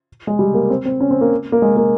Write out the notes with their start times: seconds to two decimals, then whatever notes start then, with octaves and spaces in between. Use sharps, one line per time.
0.27 G#3
0.39 G3
0.54 A#3
0.70 C4
0.85 C4
1.00 C#4
1.11 C4
1.21 A#3
1.52 A#3
1.62 G#3
1.77 A#3